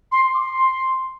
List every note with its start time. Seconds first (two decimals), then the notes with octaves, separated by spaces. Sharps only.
0.12 C6
0.34 D6
0.39 C6